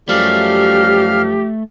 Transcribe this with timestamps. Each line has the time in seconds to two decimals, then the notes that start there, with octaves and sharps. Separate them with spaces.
0.09 F#2 F3 G3 A3 G4 F5 F6